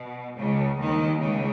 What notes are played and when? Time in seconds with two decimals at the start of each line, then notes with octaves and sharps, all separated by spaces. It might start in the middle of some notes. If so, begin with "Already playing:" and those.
Already playing: B2
0.38 C#2 C#3
0.79 D#2 D#3
1.20 C#2 C#3